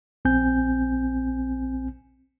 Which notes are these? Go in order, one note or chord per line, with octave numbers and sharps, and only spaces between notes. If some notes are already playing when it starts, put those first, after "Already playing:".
A#1 C4 G#5 G6